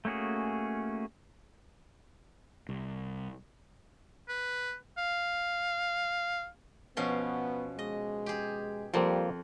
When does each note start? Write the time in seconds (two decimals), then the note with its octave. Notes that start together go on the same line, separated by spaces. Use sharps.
0.05 A3 A#3 C#4 F#4 G#4
2.69 C2
4.28 B4
4.97 F5
6.97 B2 F3 B3 C#4
7.79 G#3 D#5
8.26 G4 G#4
8.94 F2 F3 G3 A#3 C4